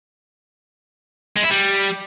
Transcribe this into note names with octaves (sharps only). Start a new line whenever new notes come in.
G#3
E4
G3